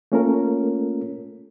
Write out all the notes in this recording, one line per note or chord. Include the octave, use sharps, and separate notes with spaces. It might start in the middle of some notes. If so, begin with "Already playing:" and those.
A3 A#3 C#4 F4 A4 A#4